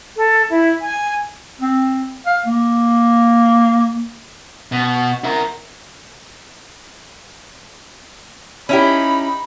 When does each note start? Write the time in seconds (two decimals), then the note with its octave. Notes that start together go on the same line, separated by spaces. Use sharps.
0.17 A4
0.50 E4
0.81 G#5
1.61 C4
2.26 F5
2.46 A#3
4.72 B2
5.24 E4 A#4
8.69 C#4 D#4 E4 G4 B5